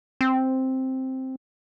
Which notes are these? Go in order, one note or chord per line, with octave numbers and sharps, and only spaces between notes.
C4